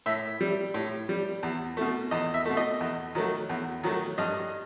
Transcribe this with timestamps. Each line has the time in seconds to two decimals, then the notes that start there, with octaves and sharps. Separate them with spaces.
0.06 A2 E5
0.41 G3
0.74 A2
1.09 G3
1.43 E2
1.77 B2 A3
2.11 E2 D#5
2.34 E5
2.45 B2 A3
2.57 D#5
2.80 E2
3.15 D#3 F#3 A3
3.49 E2
3.84 D#3 F#3 A3
4.18 G2 D#5